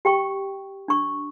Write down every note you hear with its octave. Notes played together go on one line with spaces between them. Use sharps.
G4 G5 C#6
D4 C#6